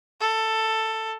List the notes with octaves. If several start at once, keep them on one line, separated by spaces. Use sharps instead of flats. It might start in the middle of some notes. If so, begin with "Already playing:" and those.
A4